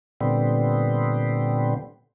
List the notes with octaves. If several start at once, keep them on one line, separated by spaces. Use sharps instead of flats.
A#2 D3 G3 B3 C4